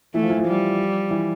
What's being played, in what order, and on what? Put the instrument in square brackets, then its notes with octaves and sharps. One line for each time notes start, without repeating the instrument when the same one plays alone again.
[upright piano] E3 E4 [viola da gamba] A3
[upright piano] F3 F4
E3 E4
F3 F4
[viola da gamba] G3
[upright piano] E3 E4